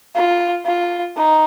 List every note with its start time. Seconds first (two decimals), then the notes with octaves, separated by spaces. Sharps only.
0.16 F4
0.65 F4
1.17 D#4